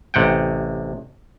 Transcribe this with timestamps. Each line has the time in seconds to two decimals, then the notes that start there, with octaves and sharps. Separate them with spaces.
0.14 A1 C3 F#5 G5